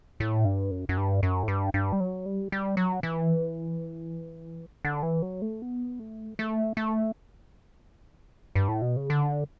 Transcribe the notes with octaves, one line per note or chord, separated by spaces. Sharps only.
A2
G2
F#2
F#2
G2
F#2
A2
G2
G2
G3
F#3
G3
G3
F#3
E3
D3
E3
F#3
A3
B3
A3
A3
A3
G2
A2
B2
C#3
D3